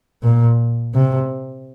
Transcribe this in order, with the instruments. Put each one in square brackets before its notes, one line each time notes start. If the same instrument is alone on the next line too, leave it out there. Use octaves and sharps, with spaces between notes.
[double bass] A#2
C3